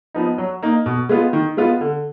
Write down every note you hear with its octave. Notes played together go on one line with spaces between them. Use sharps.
F3 B3 D#4
F#3
A#3 D#4
B2
G#3 B3 F4
D#3
G#3 B3 F4
D3